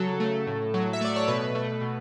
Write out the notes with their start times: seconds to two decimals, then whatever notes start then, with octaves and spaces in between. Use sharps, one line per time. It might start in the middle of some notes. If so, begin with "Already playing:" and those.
Already playing: C#3 F#3 A4
0.20 A3
0.47 A2
0.74 F#3
0.93 E5
1.01 A3 D5
1.16 C#5
1.28 B2 B4
1.55 A3
1.81 B2